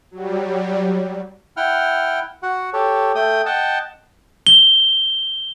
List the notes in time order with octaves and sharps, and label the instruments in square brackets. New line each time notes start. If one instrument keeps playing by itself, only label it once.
[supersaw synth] F#3 G3
[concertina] E4 F#5 G5 F6
F#4 F#5
G4 A4 C#5
A3 G5 D#6
D#5 F#5 G5 A5
[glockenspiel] G7